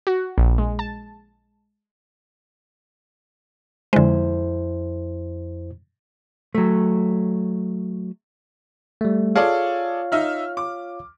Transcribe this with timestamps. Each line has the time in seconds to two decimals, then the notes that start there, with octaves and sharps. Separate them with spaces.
0.07 F#4
0.38 A#1
0.58 G#3
0.79 A5
3.93 F2 D3 G#3 E4 C5
6.55 F#3 A3
9.01 G3 A3
9.35 F4 G#4 A4 C#5 D5 F5
10.12 D#4 E5 F6
10.57 D6